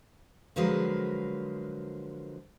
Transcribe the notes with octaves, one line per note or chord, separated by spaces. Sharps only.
D3 F3 F#3 G#3 A#4 B4